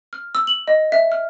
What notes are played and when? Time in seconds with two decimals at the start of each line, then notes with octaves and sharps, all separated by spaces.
0.13 F6
0.35 E6
0.47 F#7
0.68 D#5
0.92 E5
1.12 F6